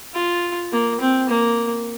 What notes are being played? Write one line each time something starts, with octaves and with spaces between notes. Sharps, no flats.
F4
A#3
C4
A#3